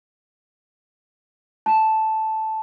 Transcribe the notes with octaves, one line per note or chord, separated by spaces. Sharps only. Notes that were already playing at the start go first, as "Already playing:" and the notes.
A5